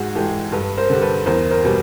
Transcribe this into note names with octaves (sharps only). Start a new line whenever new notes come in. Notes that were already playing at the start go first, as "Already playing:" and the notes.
Already playing: G#2 F#4 G#4
E3 G#3 G4 A4
G2 A4 B4
A#4 C5
D3 G3
A4 B4
E2 A#4 C5
A#4 C5
B2 G3